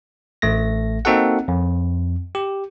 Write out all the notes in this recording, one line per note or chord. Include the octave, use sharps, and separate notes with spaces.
A1 A3 A#6
A#3 C4 D#4 F#4 A4 F#5
F2
G4